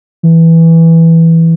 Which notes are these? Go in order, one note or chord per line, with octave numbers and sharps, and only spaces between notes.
E3